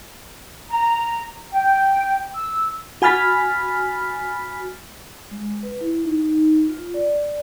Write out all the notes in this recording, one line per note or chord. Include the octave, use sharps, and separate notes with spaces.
A#5
G5
E6
F#4 G#5 B5 F6 A6 B6
G#3
B4
E4
D#4
F4
D5